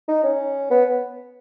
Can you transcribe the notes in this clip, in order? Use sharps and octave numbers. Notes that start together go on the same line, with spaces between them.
D#4
C#4
B3